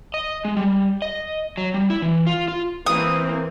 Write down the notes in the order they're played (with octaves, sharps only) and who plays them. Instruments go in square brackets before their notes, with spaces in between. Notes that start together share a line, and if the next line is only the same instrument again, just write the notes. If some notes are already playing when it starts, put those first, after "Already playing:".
[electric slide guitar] D#5
G#3
G3
D#5
F#3
G3
E4
E3
F4
F4
[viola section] E3 A#3 C4 [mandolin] D#6